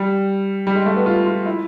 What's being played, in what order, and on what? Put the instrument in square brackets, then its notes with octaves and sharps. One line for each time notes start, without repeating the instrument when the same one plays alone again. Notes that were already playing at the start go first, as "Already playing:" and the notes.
Already playing: [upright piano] G3
G3
G#3
A3
B3
F4
F4
E4